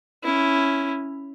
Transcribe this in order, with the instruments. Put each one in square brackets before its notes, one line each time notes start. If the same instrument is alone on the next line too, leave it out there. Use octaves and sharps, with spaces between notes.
[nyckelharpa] C#4 E4